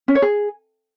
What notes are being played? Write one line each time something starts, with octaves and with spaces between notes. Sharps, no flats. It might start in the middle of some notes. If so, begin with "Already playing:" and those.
C#4
C#5
G#4